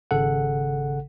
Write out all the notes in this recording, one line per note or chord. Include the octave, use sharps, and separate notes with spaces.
G#1 C#3 A4 F#5